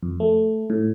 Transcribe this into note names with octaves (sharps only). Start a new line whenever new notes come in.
F2
A3
A2